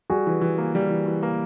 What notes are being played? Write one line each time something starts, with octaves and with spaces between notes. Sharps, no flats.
G3 F#4 G#4
E3
E3
A#3
G3
E3
E3
A#3